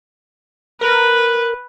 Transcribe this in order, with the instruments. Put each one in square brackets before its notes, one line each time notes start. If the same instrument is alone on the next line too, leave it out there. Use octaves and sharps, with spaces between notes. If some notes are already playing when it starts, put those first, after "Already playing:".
[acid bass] A#4 [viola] B4